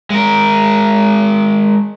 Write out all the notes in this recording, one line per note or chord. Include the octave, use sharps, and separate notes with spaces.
G#3 A#4